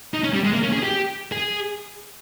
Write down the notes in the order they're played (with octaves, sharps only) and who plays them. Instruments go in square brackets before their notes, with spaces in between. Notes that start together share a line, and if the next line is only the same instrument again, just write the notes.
[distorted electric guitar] D#4
C#4
G3
G#3
A#3
C#4
G#4
G4
G#4